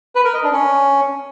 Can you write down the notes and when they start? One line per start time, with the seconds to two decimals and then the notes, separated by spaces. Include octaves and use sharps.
0.15 B4
0.25 A#4
0.34 D#5
0.43 D4
0.53 C#4